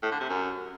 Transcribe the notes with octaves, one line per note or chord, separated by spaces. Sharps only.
A2
D3
C3
F#2